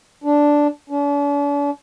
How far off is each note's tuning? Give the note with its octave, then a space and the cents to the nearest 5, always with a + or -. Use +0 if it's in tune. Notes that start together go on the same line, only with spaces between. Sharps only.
D4 -5
D4 -45